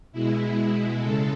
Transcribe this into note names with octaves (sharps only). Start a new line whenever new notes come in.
B2 G#3 E4
C#3 G#3 A4